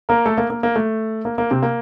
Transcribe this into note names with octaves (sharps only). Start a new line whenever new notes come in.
A#3 A#4
A3 A4
A#3
A#3
A#3
A3
A#3
A#3
C3 C4
A#3